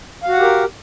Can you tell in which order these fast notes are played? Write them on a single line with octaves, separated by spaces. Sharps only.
F5 F#4 F#5 G4 A#4